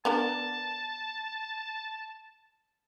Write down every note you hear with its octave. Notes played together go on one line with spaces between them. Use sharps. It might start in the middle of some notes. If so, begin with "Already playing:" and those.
B3 D4 A#4 A5